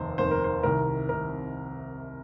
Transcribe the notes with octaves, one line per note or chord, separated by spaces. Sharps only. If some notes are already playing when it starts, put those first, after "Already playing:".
Already playing: F1 D#2 D#3 C5
F1 D#2 D#3 C5
A#4
C5
C2 C3 D#3 A#4
C3 D#3 A#4